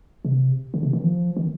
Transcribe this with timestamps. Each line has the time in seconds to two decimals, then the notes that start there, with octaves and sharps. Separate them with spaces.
0.25 C3
0.74 D3
0.83 C3
0.93 D#3
1.03 F3
1.37 D#3